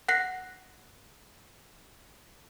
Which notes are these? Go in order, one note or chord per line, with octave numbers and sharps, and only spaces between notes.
F#5 F#6 A#6 C7